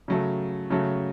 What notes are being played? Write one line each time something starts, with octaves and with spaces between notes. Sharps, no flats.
C#3 F#3 A3
C#3 F#3 A3